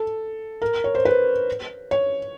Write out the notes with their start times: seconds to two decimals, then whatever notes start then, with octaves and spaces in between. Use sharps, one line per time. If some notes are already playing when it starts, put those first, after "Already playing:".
Already playing: A4
0.62 A#4
0.84 C#5
0.95 C5
1.05 B4
1.91 C#5